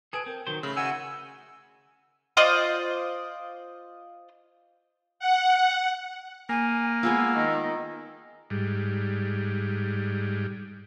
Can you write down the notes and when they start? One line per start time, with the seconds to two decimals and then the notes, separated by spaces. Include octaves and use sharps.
0.13 G#4 A4 B4 D#6 D7
0.26 C4 A#4
0.47 D#3 F#3 C5
0.63 C#3 A3 B5 E6
0.76 E4 F#4 D#5 F#5 G#5 E6
2.37 F4 C5 D5 D#5
5.19 F#5
6.49 A#3 G#5
7.03 G#3 B3 F4 G#5 E6
7.34 D#3
8.50 G#2 G3